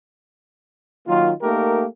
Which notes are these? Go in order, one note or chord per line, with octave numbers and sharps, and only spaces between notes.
D#3 F#3 A#3 F4
A3 A#3 D#4 G4 A#4